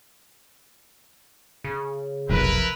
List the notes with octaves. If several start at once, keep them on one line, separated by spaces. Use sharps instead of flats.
C#3
F1 B1 F2 E4 A#4 B4